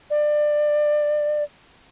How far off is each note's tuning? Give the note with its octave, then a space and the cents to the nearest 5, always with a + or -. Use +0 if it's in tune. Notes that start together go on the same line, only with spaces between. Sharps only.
D5 +20